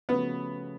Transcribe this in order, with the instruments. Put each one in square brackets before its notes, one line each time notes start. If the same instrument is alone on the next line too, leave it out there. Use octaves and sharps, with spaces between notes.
[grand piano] C#3 F3 A3 C#4 F#4 [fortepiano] B3